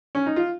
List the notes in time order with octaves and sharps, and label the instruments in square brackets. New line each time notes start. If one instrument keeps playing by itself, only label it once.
[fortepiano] C#4
D#4
F4